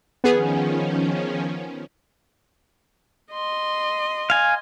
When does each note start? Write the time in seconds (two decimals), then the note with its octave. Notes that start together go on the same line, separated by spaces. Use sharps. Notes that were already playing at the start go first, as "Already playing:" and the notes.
0.24 D#3 F3 B3 C#4 G#4
3.32 D#5 C6
4.30 F5 G#5